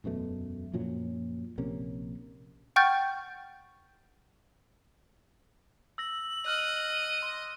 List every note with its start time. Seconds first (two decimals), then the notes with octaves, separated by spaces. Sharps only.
0.04 E1 F#2 B2 A3
0.73 F#2 A#2 F3 F#3
1.58 A#1 C3 A#3 C#4
2.76 F#5 G5 C#6 F6 G6 A6
5.98 E6 A#6 F#7
6.46 D#5 F6 F#6
7.18 C6 D#7